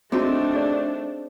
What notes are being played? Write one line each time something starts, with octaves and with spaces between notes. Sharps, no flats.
A3 C4 D4 D#4 F#4 G#4
G#4 D5